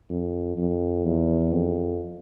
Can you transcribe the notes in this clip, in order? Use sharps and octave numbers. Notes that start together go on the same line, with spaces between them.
F2
F2
E2
F2